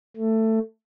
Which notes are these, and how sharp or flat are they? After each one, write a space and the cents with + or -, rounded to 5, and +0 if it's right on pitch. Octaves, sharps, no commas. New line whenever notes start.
A3 +15